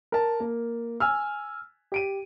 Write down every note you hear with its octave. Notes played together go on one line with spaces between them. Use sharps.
A#4 A5
A#3
G#5 E6 F6
G4 D7 D#7